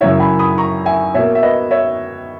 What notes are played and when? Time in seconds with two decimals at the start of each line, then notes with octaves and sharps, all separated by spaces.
0.01 F#2 C#3 E3 C#5 E5
0.20 G#5 B5
0.39 B5 D#6
0.58 A#5 C#6
0.85 E5 G#5
1.14 B2 A#3 C#5 E5
1.35 E5
1.43 B4 D#5
1.71 C#5 E5